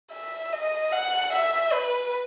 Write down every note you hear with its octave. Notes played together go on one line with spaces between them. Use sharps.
E5
D#5
F#5
E5
B4